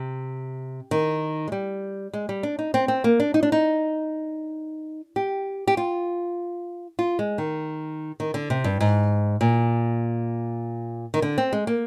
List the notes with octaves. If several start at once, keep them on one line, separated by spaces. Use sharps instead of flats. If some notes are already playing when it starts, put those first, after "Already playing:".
Already playing: C3
D#3
G#3
G3
G#3
G3
D4
D#4
C4
C4
A#3
D4
D#4
D4
D#4
G4
G4
F4
F4
G#3
D#3
D#3
D3
C3
G2
G#2
A#2
D#3
D3
C4
G#3
A#3